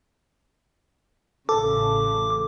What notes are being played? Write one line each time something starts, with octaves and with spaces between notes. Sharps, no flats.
A1 C#3 A4 D6